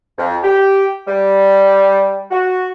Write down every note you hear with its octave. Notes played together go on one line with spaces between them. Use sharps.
F2
G4
G3
F#4